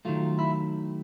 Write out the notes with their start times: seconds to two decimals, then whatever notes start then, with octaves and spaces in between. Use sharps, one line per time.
0.05 D#3 F#3 A3 F4
0.39 E4